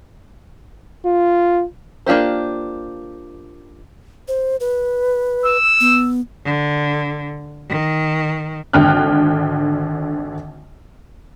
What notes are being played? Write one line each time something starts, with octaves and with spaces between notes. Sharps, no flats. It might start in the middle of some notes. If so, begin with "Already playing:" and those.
F4
A#3 D4 F4 G4 C5
C5
B4
E6
B3
D3
D#3
G#1 D3 G5 F6 F#6